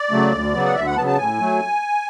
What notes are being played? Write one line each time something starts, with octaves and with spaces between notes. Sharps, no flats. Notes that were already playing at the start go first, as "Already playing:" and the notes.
Already playing: D5
C#3 F#3 A3
D2
C#3 F#3 B3
F#5
D2 E5
F#5
B5
C#3 F#3 B3 A5
A5
A2 G#5
F#3 A3